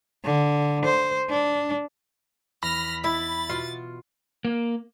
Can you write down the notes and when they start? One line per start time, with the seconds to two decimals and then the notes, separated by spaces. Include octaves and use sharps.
0.24 D3
0.85 C5
1.30 D4
2.63 E2 B5 F6 A#6
3.04 E4 A6
3.49 B2 F4 F#4 F6
4.45 A#3